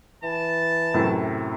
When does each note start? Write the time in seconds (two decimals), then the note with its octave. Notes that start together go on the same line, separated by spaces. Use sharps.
0.23 E3 A5
0.94 F#2 A2 C3